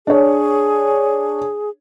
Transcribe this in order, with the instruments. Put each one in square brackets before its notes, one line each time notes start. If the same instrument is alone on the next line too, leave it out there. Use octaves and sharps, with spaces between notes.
[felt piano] D4 C#5 [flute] G#4